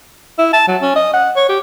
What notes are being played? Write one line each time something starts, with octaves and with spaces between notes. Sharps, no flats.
E4
A5
F#3
C#4
D#5
F#5
C#5
G4